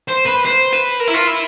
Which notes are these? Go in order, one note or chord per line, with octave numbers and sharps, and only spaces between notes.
C5
B4
C5
B4
A#4
E4
F4
E4